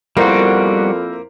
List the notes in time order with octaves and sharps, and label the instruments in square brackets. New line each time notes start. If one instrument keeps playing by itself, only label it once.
[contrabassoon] F2 [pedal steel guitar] G3 B3 F#4 [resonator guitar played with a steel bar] A#3 [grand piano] E4 A#4 C5